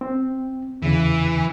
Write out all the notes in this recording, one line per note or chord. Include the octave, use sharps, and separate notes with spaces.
C4
E2 C#3 E3